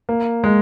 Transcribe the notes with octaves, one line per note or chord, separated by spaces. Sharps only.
A#3
G#3